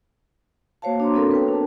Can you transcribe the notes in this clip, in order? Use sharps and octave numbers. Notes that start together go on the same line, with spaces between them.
A#3 F#4 C5 C#5 F5 A5
D4 F#4 C#5 A#5 C6 D6
B3 C4 D4 F#4 A4 A#4
B4 G5
D4 A5